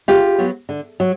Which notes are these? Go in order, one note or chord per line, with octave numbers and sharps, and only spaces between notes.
C#3 F4 G4
F#3 B3
D3
F#3